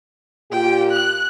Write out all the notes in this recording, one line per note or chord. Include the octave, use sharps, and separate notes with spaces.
A#2 F4 G4 G5
F#6